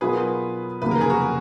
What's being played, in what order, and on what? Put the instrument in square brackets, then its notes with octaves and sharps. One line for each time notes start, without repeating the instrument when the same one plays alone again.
[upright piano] B2 F#3 B3 F4 A#4 [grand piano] G#4 B4
[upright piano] F1 D#2 C#3 F#3 A#3 [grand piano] B4
[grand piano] A#4
G#4
F#4 A#4